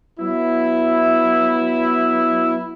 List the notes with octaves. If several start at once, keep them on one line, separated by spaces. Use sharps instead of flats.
F#3 B3 E4